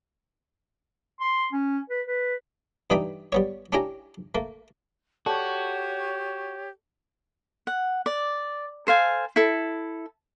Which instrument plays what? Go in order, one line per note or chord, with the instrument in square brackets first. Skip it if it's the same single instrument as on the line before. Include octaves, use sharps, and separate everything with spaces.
[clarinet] C6
C#4
B4
B4
[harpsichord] G2 E3 D4 D#4 G5 B5
G3 B3 C#5
C#4 D4 E4 G4 G#5 A#5
A3 A#3
[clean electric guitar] F#4 [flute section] G4 C#5 [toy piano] A4 D5 A5
[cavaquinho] F#5
D5
A4 C5 F5 G#5
E4 A4